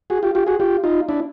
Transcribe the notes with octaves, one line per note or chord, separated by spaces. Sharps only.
F#4 G#4
F4 G4
F4 G4
F#4 G#4
F4 G4
D#4 F4
D4 E4